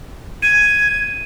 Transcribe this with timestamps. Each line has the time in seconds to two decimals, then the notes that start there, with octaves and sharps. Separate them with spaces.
0.42 G#6 D#7